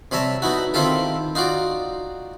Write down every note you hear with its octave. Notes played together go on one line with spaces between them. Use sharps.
C3 G3 C#5 E5 A5 A#5
B3 D#4 E4 F#4
D#3 C4 E4 F4 G4 A4
D#4 F4 F#4 D5